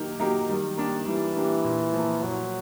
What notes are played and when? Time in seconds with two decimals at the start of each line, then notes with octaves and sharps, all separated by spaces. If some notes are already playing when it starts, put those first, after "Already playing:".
Already playing: D#3 F#3 A#3 D#4 G4
0.20 F#3 A#3 D#4 G4
0.49 D#3 G3
0.77 A#3 D4 G4
1.06 E3 G3
1.36 A#3 D4 G4
1.64 A#2
1.93 F3 A#3
2.22 A#2 F#3